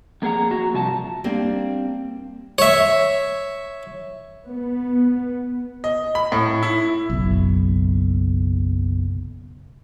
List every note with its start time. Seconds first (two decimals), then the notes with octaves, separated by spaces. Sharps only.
0.22 F2 A#3 G#4 F#5 A#5
0.51 F#4 A#5
0.73 G2 C3 F3 G#5 A5
1.24 G3 A#3 C4 D4
2.58 C#5 E5
4.46 B3
5.84 D#5
6.15 B5
6.32 A2
6.63 E4
7.10 F#1 B1